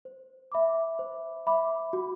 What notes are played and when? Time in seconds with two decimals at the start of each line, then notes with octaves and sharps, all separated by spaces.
0.05 C5
0.52 E5 B5 D6
0.99 C5
1.47 E5 B5 D6
1.93 F#4